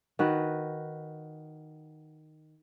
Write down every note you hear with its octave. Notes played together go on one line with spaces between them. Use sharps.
D#3 F#4 B4